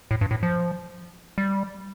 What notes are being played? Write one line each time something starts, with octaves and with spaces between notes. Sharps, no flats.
A2
G2
A2
F3
G3